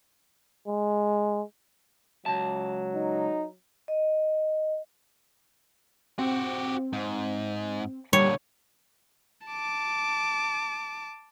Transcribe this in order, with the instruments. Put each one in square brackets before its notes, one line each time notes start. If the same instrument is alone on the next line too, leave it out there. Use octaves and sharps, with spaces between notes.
[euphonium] G#3
[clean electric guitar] C#2 A5 [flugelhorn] F#3
[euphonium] D#4
[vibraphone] D#5
[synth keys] C4 [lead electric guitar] F#4 G4
[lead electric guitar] G#2
[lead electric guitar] A#2 D3 [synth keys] G3 [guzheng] C#5
[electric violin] A5 D6